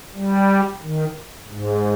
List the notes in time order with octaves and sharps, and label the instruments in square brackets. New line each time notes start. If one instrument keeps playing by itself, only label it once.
[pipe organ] G3
D#3
G#2